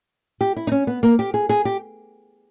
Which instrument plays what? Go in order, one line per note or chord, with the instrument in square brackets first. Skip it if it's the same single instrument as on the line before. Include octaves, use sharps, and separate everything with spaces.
[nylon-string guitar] G4
E4
D#4
C#4
B3
A#3
G4
G#4
G#4
G4